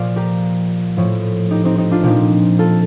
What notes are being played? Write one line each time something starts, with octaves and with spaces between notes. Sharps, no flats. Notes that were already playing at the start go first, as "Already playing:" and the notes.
Already playing: A#2 F3 D5 F5
G4 A#4
A2 F3
D#4 G4
C4 D#4
C4 D#4
D4 F4
A#2 F3 D#4 G4
F4 A4